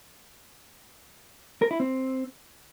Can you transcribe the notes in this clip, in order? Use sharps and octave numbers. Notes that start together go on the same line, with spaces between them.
A#4
E4
C4